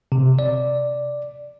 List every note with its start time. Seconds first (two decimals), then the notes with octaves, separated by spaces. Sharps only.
0.12 C3
0.39 D5